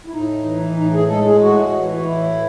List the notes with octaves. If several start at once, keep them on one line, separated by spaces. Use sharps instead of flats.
E4
A2 D#4
E3
A2 D#4
G#4
G#3 A4
G#4
A2 F#4
E3
F#4
A2 E4